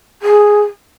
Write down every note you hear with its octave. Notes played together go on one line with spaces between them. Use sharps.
G#4